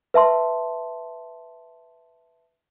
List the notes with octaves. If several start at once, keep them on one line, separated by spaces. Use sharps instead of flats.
B4 E5 A5 C6